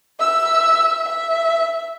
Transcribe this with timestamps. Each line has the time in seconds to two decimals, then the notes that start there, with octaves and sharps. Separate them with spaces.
0.19 E5 E6
1.08 E5